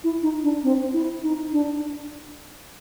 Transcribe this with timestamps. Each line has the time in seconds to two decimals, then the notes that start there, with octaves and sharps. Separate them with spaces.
0.04 E4
0.23 D#4
0.43 D4
0.63 C4
0.93 E4
1.23 D#4
1.52 D4